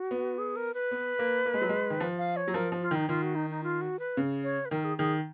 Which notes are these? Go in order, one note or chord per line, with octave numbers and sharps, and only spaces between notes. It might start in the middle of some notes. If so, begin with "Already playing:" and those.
Already playing: F#4
B3
G#4
A#4
B4
B3
A#3
A#3
G#3
F#3
G#3
D#3
F3
F5
C#5
F#3
F3 A#4
F3
F4
D#3 D#4
D#3 F4
F#4
D#4
D#4
F4
F#4
B4
C#3
C#5
B4
D#3 A#4
G#4
D#3 G#4